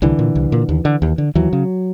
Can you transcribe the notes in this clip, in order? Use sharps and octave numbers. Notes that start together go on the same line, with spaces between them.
C2 D3 E3
A#2
C2
A#2
D#2
D3
D#2
D3
D#2 E3 F#3
C#3